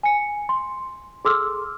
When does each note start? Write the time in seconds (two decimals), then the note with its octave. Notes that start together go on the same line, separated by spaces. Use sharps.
0.03 G#5 C#7
0.49 C6
1.25 G#4 A4 C6 D6 E6 F6